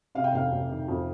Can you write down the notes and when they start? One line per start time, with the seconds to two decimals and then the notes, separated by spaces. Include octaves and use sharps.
0.15 C3 F5
0.24 G5
0.33 F1 F5
0.52 F1
0.69 D#3
0.88 F2